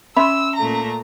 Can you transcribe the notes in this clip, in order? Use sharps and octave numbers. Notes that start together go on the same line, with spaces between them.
C#4 E5 B5 C6 E6
A#2 A3 A#5